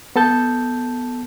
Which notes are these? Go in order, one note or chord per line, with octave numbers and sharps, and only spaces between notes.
B3 A4 A5 G6